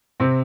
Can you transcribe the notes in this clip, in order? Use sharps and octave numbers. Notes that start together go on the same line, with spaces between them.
C3 C4